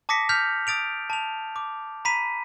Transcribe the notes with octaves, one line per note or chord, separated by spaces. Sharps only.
A5 D6 D#6 A#6 B6 C#7
F6 G6 B6 F7
D#6 A6 D7 F7
A5 F7
D6
A#5 B5 B6 D#7